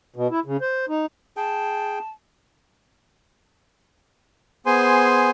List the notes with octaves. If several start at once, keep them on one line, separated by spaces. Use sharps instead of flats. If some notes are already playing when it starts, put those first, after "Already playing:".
B2
E4
C#3
C5
D#4
G#4 G5 A5
B3 G#4 C5 G#5 C6